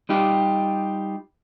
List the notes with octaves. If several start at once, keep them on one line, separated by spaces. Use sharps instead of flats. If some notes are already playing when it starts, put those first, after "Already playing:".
G3 D#4 F4 G4